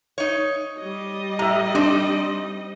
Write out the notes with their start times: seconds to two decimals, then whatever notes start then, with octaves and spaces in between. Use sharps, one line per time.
0.18 D#4 C#5
0.79 G3 D#5
1.39 A2 E5 A#5
1.75 C4 D4 D#4